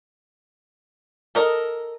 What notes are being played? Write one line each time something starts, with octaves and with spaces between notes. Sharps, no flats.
A4 A#4 D#5